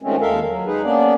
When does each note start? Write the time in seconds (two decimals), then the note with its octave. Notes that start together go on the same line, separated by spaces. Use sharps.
0.02 D#3 F3 G#3 A3 C4 C#4
0.21 D#2 G#3 A4 A#4 E5 F5
0.47 F#3
0.66 G#3 D#4 G#4 B4
0.83 A#3 B3 C#4 D4 D5